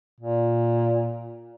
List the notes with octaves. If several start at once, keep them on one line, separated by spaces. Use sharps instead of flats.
A#2